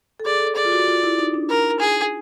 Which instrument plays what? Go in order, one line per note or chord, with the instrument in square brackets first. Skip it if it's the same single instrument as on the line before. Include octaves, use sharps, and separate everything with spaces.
[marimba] A4
[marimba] G#4 [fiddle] D5
[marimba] A4
[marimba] G#4 [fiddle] D5
[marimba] F4
F#4
F4
E4
D#4
D4
[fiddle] A#4
G#4